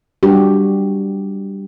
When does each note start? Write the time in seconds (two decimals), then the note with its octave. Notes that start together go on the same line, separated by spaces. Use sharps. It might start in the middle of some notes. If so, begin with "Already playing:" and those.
0.23 G3 D4 F#4 G4